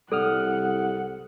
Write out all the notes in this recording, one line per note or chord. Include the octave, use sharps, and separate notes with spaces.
C2 G3 A4 F#5 D#6 F6